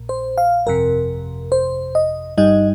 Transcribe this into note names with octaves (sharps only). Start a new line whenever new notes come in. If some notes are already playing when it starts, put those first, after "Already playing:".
Already playing: A#1 A#2
C5
F5
G1 F2 C3 A#4
C5
D#5
G1 G2 G3 D#4 D#5